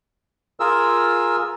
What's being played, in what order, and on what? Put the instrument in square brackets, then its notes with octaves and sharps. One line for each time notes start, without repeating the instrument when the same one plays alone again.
[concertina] F4 G#4 A#4 E6